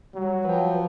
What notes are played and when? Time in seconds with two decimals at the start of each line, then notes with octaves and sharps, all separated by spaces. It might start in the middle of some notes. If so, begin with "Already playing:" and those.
0.15 F#3 G3
0.45 F3 B4 G5